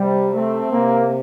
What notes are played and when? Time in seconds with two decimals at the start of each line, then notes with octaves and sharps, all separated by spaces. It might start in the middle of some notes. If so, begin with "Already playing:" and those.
Already playing: C3 G3
0.32 A3 C4
0.71 C3 A#3